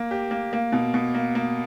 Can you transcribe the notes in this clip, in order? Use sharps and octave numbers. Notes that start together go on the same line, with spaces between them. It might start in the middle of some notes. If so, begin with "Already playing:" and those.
Already playing: A#3
G4
A#3
A#3
B2
B2
A#3
A#3